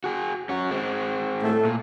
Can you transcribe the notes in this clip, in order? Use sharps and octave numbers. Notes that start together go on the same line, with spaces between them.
F#4 G#4
C#4 F#4
G#3 C4
A2 A3
A#2